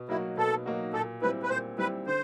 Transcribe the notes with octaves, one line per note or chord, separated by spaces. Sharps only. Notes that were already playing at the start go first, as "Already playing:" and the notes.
Already playing: B2
F#3 A#3 D#4 E4 F#4
B2 A4
F#3 A#3 D#4 F#4
A#2 A4
G3 C4 E4 B4
B4
A#2 C5
G3 C4 E4 B4
D3 C5